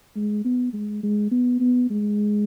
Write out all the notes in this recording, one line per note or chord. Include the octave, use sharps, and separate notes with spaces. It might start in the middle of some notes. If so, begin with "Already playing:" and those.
G#3
B3
G#3
G#3
B3
B3
G#3